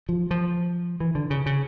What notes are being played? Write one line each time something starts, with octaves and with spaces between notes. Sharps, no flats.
F3
F3
E3
D3
C#3
C#3